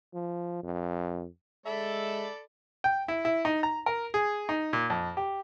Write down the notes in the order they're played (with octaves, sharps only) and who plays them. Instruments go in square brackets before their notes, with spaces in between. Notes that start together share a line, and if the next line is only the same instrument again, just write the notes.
[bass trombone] F3
F2
[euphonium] G#3 [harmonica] A4 D5 B5 [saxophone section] E5
[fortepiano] G5
E4
E4
D#4
A#5
A#4
G#4
D#4
A#2
F2
G4